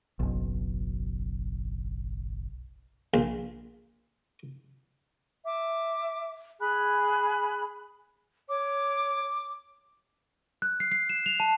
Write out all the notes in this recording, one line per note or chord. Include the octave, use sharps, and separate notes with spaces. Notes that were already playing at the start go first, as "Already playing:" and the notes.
F#1 B1
A#1
E5 D6
G#4 G#5 B5 F#6
C#5 D6
F#6
C7
C7
E7
F7
A5